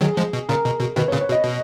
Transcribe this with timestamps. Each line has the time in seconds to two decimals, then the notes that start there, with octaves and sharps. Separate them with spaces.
0.01 D#3 F#3 G#4
0.17 F3 G#3
0.33 B2
0.49 A#2 C#3 A#4
0.65 B2
0.81 B2
0.96 B2 D#3 B4
1.08 C#5
1.12 A#2 C#3
1.21 C#5
1.29 B2
1.32 D#5
1.44 B2